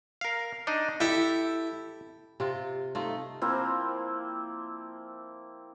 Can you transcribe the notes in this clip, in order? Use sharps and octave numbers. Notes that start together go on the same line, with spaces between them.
A#4 F5
D4 D#4 D#5
E4 G4 A4
C3 F4
A3 D#4 F4
F3 A#3 C4 E4